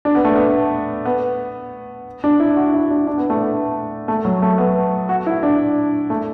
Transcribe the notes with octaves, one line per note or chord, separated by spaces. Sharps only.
D4
B3
A3
B3
B3
D4
E4
F#4
E4
D4
D4
B3
A3
B3
A3
F#3
A3
B3
F#4
E4
D4
A3